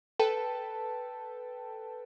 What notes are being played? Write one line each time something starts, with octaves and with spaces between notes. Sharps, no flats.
A4 B4 G5 A5